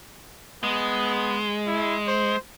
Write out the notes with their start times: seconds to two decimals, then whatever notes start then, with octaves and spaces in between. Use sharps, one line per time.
0.63 G#3 B3
1.67 E4
2.08 C5